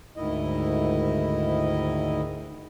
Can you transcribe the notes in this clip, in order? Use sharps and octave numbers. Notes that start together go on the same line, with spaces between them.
D2 G#2 D#3 E4 D#5